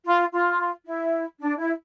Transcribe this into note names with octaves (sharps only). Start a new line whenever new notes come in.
F4
F4
E4
D4
E4